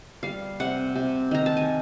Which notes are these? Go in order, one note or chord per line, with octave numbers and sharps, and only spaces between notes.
G3 F5
C3 F#5
C3
D#3 A#5
A5
G#5